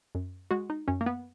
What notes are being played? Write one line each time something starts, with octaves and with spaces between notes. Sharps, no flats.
F#2
G#3 F#4
D#4
F#2 C#4
A#3
B3